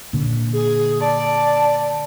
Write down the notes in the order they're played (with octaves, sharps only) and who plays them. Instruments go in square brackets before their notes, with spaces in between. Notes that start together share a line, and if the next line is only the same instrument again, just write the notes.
[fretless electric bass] A#2 D3
[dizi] G#4
[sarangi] D5 [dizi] A5